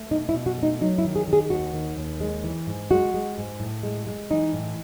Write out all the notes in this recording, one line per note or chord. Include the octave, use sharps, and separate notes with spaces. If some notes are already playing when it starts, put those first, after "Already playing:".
Already playing: A3
B2 D#4
E4
B2
F#4
A3 D#4
F#3 D#4
E4
D#3
G#4
D#3
G#4
D#2 F#4
D#3
D#2
G#3
E3
G#2
G#3 F#4
G#3
G#2
A2
G#3
G#3
E3 D#4
A2